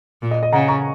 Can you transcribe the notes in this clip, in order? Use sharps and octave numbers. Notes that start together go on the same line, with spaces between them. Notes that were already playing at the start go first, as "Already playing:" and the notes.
A#2
D#5
D#5
C#3 F#5 A#5
A#5 C#6